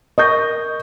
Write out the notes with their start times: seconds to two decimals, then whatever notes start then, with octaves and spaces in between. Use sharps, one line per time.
0.18 A#4 D#5 C#6 G6